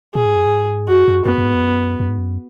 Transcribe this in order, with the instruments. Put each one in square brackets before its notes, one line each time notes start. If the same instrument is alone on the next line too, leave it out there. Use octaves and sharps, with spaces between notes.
[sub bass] A#2 [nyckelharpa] G#4
[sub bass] G#2
F#2
G#2
[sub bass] F#2 [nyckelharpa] F#4
[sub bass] F#2
[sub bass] F#2 [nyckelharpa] B3
[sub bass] F#2
G#2
F2
F#2
F#2
G#2
F#2